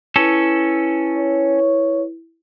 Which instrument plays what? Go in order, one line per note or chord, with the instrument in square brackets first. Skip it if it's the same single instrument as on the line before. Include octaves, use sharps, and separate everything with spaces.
[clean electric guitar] C#4 A4 [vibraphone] E4 B4
[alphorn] C#5